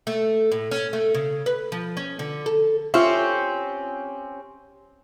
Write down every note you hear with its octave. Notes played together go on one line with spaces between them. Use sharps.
A3
A2
C#4
A3
C#3
B4
F3
C#4
D3
A4
C4 C#4 F4 G4 E5